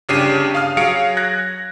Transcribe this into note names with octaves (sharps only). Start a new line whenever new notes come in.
G1 C#3 D4 G4 C7 D#7
F5 D#6 F6
F#3 G#4 C#5 F5 C#7 D7
F#6 G#6 A#6